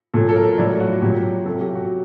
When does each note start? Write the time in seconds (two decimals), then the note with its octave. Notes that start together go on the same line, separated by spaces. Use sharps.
0.14 A#2 F#3 A4
0.29 A4
0.36 A#4
0.58 A2 F#3 D5
0.80 F#4
1.02 A#2 F#3 G4
1.46 C3 F#3 A4
1.61 G4
1.75 F#4